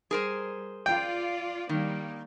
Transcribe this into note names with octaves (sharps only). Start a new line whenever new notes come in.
G3 G#4 A#4 C5
F4 D5 G5
D#3 G3 A#3